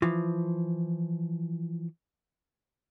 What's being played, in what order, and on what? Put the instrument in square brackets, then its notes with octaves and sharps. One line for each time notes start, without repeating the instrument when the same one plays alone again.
[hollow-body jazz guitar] E3 F3